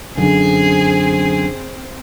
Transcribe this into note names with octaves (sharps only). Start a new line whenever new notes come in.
F#2 D3 C4 G#4